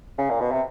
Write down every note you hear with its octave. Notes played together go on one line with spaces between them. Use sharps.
C#3
A#2
B2
C3